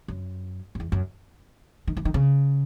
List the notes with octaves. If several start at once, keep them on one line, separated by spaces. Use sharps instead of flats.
F#2
F#2
E2
F#2
D#3
E3
D#3
C#3